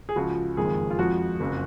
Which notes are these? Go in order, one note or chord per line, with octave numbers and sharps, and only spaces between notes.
G#4
C#2 C#3 F3 F#4
F#1 F2 D#3 G#3 G#4
F4
F2 F3 G#3 F#4
F#1 F2 C#3